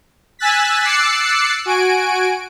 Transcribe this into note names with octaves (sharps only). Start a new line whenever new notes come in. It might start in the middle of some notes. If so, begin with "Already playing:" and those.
G#5 E6 F#6 A6 B6
D6 E6 F#6 A6 C7 C#7
F#4 G#5 D7